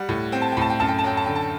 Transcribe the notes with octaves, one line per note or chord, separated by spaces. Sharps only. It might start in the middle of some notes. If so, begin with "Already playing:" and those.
Already playing: G3 F#5
A2
C4 G5
A5
G5
A2 A5
G5
F#2 A5
G5
A5
F#3 G5
A5
D3 G5
A5